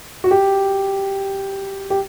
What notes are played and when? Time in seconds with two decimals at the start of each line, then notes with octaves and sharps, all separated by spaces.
0.24 F#4
0.31 G4
1.90 G4